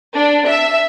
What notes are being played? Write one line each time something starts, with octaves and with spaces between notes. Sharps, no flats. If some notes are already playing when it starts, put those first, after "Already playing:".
D4
E5